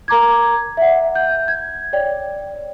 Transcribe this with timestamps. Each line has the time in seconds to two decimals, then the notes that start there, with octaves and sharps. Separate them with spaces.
0.08 A#4 A#5 D6 G#6
0.77 E5 F#5
1.15 G6
1.48 G#6
1.93 C#5 D5 G5